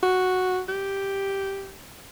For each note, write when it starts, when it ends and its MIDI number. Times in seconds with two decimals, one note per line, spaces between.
0.03 0.61 66
0.69 1.73 67